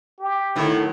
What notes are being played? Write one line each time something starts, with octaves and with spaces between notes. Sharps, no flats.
G4
A2 D#3 F#3